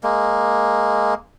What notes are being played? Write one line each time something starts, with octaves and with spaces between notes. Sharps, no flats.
G#3 A#3